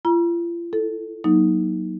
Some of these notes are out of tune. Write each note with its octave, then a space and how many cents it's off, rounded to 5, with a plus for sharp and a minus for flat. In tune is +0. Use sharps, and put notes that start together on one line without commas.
F4 -40 A#5 +45
E4 +0 A4 +0
F#3 +0 A#3 +30 D#4 +10